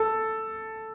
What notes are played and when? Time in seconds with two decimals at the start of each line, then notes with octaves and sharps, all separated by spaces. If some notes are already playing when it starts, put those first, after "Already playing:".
Already playing: A4